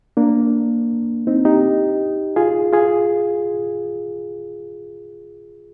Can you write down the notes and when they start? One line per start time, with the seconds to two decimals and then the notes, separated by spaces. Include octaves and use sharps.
0.17 A#3 D4
1.27 C4 D#4
1.45 D#4 G4
2.36 F4 G#4
2.72 F4 G#4